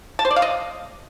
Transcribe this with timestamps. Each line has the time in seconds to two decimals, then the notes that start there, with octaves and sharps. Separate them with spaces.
0.19 A5
0.25 C5
0.31 D5
0.36 F5
0.42 D#5